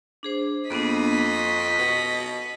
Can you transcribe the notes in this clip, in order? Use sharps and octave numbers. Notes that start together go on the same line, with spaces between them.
D4 G#4 C5
F2 A#3 B3 D4 D#5 B6
C#6
B2